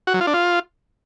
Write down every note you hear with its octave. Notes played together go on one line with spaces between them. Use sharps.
F#4
F#3
F4
D4
F4